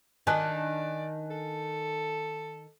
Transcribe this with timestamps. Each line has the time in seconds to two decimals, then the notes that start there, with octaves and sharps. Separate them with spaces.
0.27 D#3 D4 D5 G#5 A5 F#6
1.30 A4